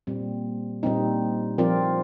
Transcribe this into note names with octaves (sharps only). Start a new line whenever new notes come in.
A#2 G3 C4
A#2 G3 C4 D#4
F3 C4 F4 A#4 D5